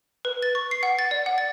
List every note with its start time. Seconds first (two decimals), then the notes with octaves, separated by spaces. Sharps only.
0.25 B4
0.43 A6
0.55 C#6
0.71 C7
0.83 F#5
0.99 A6
1.11 D5
1.26 F#5
1.38 A6